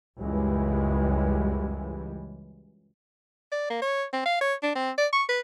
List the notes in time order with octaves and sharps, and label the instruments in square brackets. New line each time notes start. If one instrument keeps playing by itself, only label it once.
[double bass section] C#2 F#2 E3 G3 G#3
[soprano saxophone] D5
A#3
C#5
C4
F5
C#5
D4
C4
D5
C#6
B4